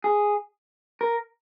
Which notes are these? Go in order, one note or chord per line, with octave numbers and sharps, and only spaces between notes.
G#4
A#4